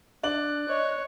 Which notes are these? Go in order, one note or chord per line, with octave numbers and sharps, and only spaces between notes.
D4 D5 F#6 F#7
C#5 D#5